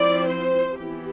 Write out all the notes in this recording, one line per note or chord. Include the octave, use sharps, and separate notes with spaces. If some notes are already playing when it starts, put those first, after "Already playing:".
Already playing: F3 C4 E4 D5
C5
E3 B3 E4 G4